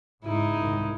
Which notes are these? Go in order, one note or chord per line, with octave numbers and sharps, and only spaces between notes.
G#2 C#3 D#4 E4
C2 G#2 D#3